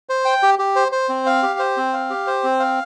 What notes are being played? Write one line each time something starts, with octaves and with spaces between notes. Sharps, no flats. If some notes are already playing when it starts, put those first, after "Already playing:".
C5
G5
G4
G4
C5
C5
C4
F5
G4
C5
C4
F5
G4
C5
C4
F5